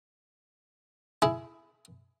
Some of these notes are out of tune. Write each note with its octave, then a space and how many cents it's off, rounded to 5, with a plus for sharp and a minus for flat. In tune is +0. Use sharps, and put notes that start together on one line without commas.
E4 +15 G#4 +15